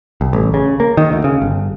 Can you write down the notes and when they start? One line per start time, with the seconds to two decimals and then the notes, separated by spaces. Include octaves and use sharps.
0.21 C2
0.33 A1
0.54 C#3
0.80 A#3
0.97 D#3
1.12 D2
1.24 C#3
1.42 G1